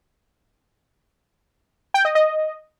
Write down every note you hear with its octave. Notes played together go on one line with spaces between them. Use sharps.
G5
D#5
D#5